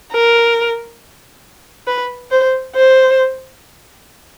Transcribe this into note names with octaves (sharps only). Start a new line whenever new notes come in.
A#4
B4
C5
C5